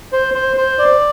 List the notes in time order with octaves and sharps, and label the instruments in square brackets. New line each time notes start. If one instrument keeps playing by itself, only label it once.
[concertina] C5
C5
C5
D5